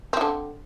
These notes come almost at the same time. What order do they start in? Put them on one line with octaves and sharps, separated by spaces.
C4 E3 D3